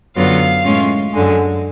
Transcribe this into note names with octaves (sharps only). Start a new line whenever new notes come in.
F#2 D3 F#3 B3 F4 F5
A2 G#3 C#4 F4
F#2 D3 G#3